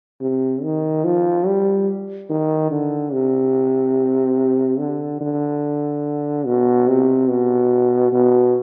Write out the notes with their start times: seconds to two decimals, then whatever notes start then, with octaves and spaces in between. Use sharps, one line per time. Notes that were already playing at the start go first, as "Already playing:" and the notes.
0.21 C3
0.63 D#3
1.04 F3
1.46 G3
2.30 D#3
2.71 D3
3.13 C3
4.79 D3
5.21 D3
6.46 B2
6.88 C3
7.29 B2
8.12 B2